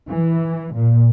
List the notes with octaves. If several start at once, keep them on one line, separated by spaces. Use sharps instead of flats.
E3
A#2